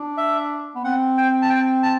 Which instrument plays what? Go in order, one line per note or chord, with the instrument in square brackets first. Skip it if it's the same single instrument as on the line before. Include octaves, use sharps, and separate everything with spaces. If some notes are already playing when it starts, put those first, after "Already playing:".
Already playing: [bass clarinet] D4
[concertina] E5
[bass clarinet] B3
[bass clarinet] C4 [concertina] F#5
[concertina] G5
A5
G5
A5